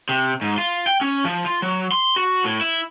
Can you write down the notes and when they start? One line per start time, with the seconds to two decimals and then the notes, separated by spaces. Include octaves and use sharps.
0.09 C3
0.42 G#2
0.58 F4
0.87 G5
1.01 C#4
1.25 F3
1.45 F4
1.62 F#3
1.92 C6
2.16 F#4
2.44 A2
2.61 E4